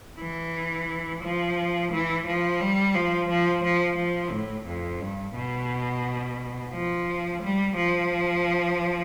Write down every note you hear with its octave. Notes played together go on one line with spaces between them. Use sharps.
E3
F3
E3
F3
G3
F3
F3
F3
F3
A2
F2
G2
B2
F3
G3
F3